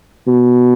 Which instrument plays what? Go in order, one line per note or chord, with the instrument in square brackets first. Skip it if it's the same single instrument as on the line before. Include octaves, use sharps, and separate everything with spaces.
[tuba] B2